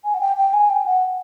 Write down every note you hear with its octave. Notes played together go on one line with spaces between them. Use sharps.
G#5
F#5
G5
G5
G#5
G5
F#5